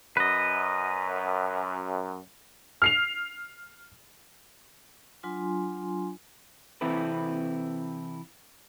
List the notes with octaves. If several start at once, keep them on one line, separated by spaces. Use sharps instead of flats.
F#2 B4 D#5
F6 C7 F7
F#3 D4 F4 G#5 C6
C3 E3 C4 E4 A4 B4